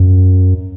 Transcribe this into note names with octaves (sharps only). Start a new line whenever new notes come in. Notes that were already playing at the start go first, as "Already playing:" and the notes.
Already playing: F#2